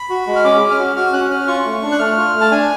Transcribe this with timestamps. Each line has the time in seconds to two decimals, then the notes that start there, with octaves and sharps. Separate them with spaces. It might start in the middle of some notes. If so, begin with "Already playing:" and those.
Already playing: B5
0.10 F#4
0.27 G#3
0.36 F6
0.44 C#4 D6
0.62 C#4
0.71 F6
0.79 F#4
0.96 F#4 F6
1.13 C#4 F#6
1.30 C#4 F6
1.47 F4 C#6
1.65 A3
1.83 D4
1.92 F#6
1.99 A3 F6
2.17 F4
2.34 A3
2.41 A5
2.51 D4 G#5